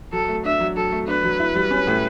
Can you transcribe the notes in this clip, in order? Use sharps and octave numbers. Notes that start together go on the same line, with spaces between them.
F#3 A4
A3
D4 E5
F#3
F#3 A4
A3
D4 B4
F#3
E4
G3
C#4
A2